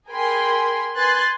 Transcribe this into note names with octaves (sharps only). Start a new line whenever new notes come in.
G#4 A#4 G5 G#5 B5 C6
B4 G#5 C6 F#6 A6